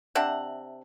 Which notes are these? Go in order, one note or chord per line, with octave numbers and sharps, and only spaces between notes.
C3 D4 E5 F#5